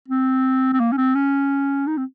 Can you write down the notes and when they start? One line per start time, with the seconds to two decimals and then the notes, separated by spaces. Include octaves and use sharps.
0.08 C4
0.73 C4
0.80 A#3
0.92 C#4
0.97 C4
1.15 C#4
1.87 D#4
1.97 C4